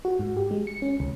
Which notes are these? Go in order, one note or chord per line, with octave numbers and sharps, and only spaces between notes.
F#4
G#2
G4
G#3
C#7
C#4
C#2